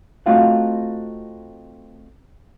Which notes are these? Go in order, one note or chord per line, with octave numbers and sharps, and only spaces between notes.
A3 C4 D#4 F4 F#4 F5